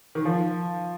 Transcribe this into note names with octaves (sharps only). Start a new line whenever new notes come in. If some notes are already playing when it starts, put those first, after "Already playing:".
D#3
F3